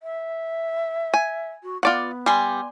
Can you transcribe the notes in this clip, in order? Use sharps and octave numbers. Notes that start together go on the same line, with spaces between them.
E5
G#5
F#4
B3 F4 D5 F#5
G3 G#5 C6